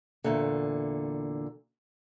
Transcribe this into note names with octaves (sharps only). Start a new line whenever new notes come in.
E2 A#2 D3